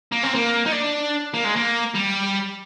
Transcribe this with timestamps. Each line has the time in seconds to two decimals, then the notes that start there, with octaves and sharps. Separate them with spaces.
0.12 A#3
0.23 C4
0.35 A#3
0.66 D#4
0.72 D4
1.34 A#3
1.45 G#3
1.56 A#3
1.95 G3